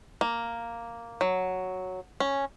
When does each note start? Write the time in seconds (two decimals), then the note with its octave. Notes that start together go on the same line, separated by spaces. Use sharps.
0.21 A#3
1.21 F#3
2.20 C#4